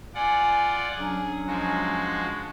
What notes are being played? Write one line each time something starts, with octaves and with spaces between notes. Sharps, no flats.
F4 D5 F#5 G#5
F#3 C#4 D4 G#4
F3 G#3 F#4